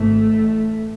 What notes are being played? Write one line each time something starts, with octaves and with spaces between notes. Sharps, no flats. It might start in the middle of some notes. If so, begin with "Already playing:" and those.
Already playing: G#1 G#2 A3
A1 A2